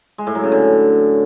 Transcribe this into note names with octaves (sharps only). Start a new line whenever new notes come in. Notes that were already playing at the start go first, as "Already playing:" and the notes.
G#3
A2
F#3
C#3
D3